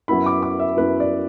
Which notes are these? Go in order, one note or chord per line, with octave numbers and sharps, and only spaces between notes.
F#2 F#3 B3 E4 B5
D6
D6
E5
F#2 F#3 B3 E4 B4
D5